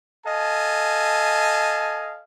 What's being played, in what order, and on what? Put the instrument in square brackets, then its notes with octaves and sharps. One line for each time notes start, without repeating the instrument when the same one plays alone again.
[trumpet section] A4 D#5 F5 G#5 A5